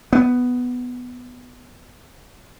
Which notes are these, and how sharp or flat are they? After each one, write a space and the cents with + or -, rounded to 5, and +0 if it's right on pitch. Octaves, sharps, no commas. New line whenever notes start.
B3 +5